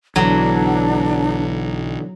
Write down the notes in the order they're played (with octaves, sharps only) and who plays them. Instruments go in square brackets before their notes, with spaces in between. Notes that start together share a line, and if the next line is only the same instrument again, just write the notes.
[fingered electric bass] B1 [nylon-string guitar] D3 E3 [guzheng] F#3 [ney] D4